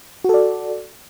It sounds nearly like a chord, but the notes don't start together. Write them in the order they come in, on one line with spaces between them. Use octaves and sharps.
F#4 A4 D5